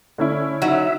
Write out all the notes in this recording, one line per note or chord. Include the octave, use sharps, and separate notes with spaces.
D3 C#4 E4
F#3 D#4 E5